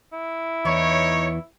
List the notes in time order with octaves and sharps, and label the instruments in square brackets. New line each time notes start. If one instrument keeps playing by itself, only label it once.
[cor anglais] E4
[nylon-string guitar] E2 E3 [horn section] D#4 C#5